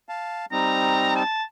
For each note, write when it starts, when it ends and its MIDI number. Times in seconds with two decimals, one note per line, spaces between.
0.09 0.46 77
0.09 0.46 81
0.52 1.23 55
0.52 1.23 60
0.52 1.23 63
0.52 1.12 82
1.16 1.43 81